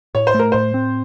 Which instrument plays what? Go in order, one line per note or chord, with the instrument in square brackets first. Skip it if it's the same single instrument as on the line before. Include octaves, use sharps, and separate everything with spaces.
[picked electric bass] A2 [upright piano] C#5
[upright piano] C5
[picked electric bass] A3
[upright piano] A#4
[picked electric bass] A2 [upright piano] C5
[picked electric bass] C4